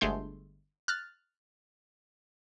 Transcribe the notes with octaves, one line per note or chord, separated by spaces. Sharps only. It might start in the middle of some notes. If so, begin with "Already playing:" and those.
G1 G#3 A3 C6 G6
F6 F#6 A6